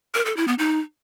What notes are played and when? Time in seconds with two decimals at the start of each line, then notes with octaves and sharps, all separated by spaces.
0.15 A#4
0.26 A4
0.37 E4
0.48 B3
0.59 D#4